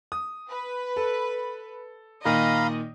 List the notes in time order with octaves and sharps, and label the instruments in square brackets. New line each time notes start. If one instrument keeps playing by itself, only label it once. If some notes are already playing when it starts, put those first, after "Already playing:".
[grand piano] D#6
[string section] B4
[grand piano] A4
[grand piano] A#2 D#3 [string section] D#5 [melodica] F5 A#5 B5